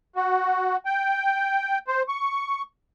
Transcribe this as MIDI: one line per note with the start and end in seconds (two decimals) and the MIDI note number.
0.16 0.77 66
0.86 1.79 79
1.88 2.02 72
2.08 2.62 85